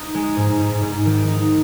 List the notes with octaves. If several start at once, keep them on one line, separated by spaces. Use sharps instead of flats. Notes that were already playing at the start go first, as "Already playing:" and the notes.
Already playing: D#4
G#3
G#2
G#2
G#2
D#3
D#4